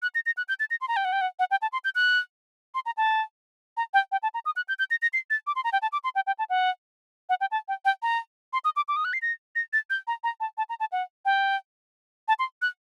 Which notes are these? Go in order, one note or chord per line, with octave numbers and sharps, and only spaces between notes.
F#6
A#6
A#6
F#6
G6
A6
A#6
C6
A#5
G5
F#5
G5
F#5
F#5
G5
A5
C6
G6
F#6
C6
A#5
A5
A#5
G5
G5
A5
A#5
D#6
F#6
G6
G6
A#6
A#6
C7
A6
D6
C6
A#5
G5
A5
D6
C6
G5
G5
A5
F#5
F#5
G5
A5
G5
G5
A#5
C6
D#6
D6
D6
D#6
F#6
C7
A#6
A#6
A6
G6
A#5
A#5
A5
A5
A#5
A5
F#5
G5
A5
C6
F#6